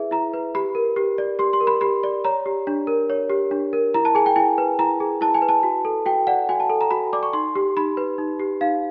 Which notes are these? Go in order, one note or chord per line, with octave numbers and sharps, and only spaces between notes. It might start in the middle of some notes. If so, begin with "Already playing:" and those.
Already playing: E4 G#4 B4 E5
E4 A#5
B4
G4 B5
A#4
G4
D5
G4 C6
C6
A#4
B5
G4 B5
D5
C#5 A#5
G4
D4
A#4
C#5
G4
D4
A#4
E4 A#5
A5
G#4 G#5
G5
E4 G#5
B4
E4 A#5
G#4
E4 A5
G#5
B4
A5
F#4
A4
F#4 G5
D5 F#5
F#4 G#5
A5
A4
A#5
F#4 B5
D5 D6
C#6
D#4 C6
G4
D#4 B5
B4
D#4
G4
D#4 F5